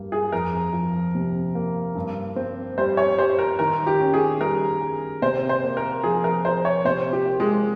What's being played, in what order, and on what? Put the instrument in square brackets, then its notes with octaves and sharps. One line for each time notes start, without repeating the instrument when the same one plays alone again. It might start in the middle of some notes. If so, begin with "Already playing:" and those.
Already playing: [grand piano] G2 G3 A#3
[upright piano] G#4
[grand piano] F2 [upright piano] A#4
[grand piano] F3
C3
A#3
G2
C4
[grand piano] G3 [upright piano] C5
[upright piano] C#5
[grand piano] G4 [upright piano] C5
[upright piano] A#4
[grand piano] D#3 [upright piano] A#4
[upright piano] G4
[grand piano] C#4
[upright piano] G#4
[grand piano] G3 [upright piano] A#4
[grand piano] G#4
[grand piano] C3 [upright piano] C5
[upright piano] C5
[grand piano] A#3
[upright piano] A#4
[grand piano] F3 [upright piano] G#4
[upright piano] A#4
[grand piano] F4 [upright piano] C5
[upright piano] C#5
[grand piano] C3 [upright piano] C5
[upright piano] G4
[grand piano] A#3
[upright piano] G#3